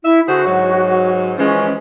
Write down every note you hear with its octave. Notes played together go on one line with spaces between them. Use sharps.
E4 E5
D3 F#4 G#4 C5
G#2 F#3
E3 F3 G#3 C#4